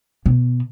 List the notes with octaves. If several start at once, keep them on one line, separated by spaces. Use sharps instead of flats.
B2